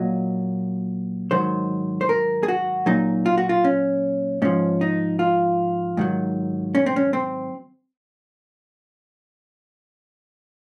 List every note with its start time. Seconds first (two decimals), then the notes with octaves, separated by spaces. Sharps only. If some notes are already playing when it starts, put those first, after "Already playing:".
Already playing: A#2 F#3 D#5
1.31 G#2 D#3 F#3 C5
2.01 C5
2.09 A#4
2.43 G#4
2.48 F#4
2.86 A#2 F#3 D#4
3.26 F4
3.38 F#4
3.49 F4
3.64 C#4
4.42 G#2 F3 C#4
4.81 D#4
5.19 F4
5.97 G#2 D#3 F#3
6.75 C#4
6.86 C4
6.96 C#4
7.13 C4